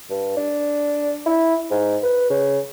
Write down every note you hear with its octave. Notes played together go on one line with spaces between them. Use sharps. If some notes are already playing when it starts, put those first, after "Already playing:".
G2
D4
E4
G#2
B4
C#3